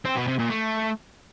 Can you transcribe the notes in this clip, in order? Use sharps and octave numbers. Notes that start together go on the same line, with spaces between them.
C4
B2
C3
A#2
A3